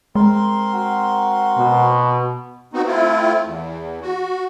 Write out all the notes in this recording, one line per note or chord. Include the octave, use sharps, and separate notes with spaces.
G#3 C4 A#4 C6
F#4
B2
B3 C4 D#4 F#4
A3 C4 E4 F4
E2
F#4